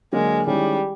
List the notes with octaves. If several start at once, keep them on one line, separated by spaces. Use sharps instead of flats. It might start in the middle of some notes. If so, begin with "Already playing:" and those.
D3 F#3 G#3 A#3
D#3 G3 G#3 C#4 E4